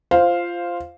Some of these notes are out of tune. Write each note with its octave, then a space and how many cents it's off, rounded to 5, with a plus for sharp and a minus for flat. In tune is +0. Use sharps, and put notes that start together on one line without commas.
F4 -15 C5 +0 F5 +0